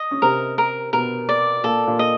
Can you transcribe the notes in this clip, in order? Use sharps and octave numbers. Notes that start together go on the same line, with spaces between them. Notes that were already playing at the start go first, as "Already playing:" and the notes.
Already playing: D#5
C#4
C3 C4 A#4
A#4
B2 B3 A#4
D5
A#2 A#3 A4
A#2 A#3
D#5